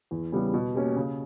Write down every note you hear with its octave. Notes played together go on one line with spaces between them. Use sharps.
E2
C#3 G3 B3
B2
A#3 C#4 G4
C#3